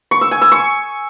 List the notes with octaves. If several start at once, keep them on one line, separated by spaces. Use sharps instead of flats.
C#6
E6
G#5
E6
C#6